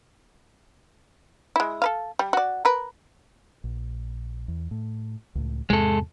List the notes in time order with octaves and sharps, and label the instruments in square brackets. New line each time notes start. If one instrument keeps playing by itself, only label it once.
[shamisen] G#3 E4
A4 B4 F5
G3
F#4 D5
A#4 B4
[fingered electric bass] A#1
E2
A2
C#2 A2
[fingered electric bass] E2 G#2 C3 [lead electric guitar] G#3 A4